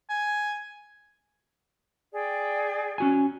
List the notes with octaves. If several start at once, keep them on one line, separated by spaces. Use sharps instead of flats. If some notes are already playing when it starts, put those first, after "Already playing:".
G#5
G#4 D5 G5
C#4 F#4 G#5